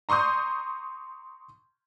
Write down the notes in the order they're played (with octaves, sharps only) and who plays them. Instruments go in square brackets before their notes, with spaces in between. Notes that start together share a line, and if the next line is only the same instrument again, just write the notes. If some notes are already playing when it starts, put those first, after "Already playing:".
[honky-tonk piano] A#5 C6 C#6 D#6 G6